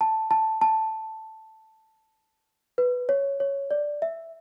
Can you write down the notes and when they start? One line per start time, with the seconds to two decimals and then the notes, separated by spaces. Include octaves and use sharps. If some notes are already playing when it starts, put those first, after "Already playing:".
0.01 A5
0.31 A5
0.62 A5
2.78 B4
3.09 C#5
3.40 C#5
3.71 D5
4.02 E5